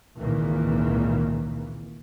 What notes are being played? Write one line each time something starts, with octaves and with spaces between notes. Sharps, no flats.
G#1 C#2 A#2 D#3 E3 A#3